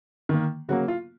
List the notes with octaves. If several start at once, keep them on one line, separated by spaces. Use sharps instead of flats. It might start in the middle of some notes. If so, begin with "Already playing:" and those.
D#3 A#3
C#3 F#3 A#3 F#4
F4